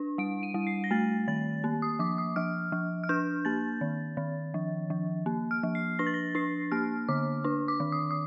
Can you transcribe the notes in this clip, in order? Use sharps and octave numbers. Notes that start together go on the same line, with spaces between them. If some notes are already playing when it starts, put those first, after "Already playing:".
Already playing: D4
G3 D7
D#7
G3
C7
A#6
A3 A6
D#3 A6
A#3
D#6
F3 D6
D#6
F3 F6
F3
F6
D4 G6
A#3 A6
D#3
D#3
F3
F3
A#3
F6
F3
C7
D4 A#6
A6
A#6
D4 C7
A#3 F6
D3 D6
D4
D6
D#3
D#6
D#6